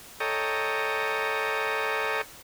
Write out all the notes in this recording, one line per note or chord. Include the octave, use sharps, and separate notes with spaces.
A4 C#5 D#5 G5 A#5